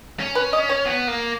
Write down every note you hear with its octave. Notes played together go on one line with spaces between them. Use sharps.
C#4
B4
D#5
C#5
B3
A#3